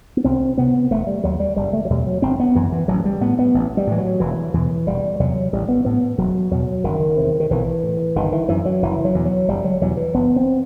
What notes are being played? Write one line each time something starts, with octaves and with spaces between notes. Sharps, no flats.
B3
C2 C4
C3 B3
E1 A3
G3
D#2 F#3
G3
F#1 G3
A3
F#3
E2 B2 G3
F#3
G1 C4
B3
F#2 E3
E3
A1 F#3
G3
A2 B3
B3
A1
G3
A2 E3
F#3
E1 E3
E2 B2 E3
E1 G3
E2 C3 F#3
A1 G3
B3
A2 B3
E1 F#3
E2 B2 F#3
F#1 D#3
E2 C3
D#3
B1 E3
A2
G1 D#3
E3
F#2 E3
F#3
F#1 E3
F#3
E2 B2
F#3
F#1 G3
F#3
E2 B2 F#3
E3
F#1 B3
C4